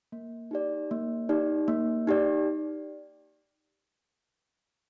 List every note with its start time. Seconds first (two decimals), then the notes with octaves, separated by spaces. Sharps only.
0.12 A#3
0.51 D#4 G4 D5
0.91 A#3
1.29 D#4 G4 D5
1.68 A#3
2.07 D#4 G4 D5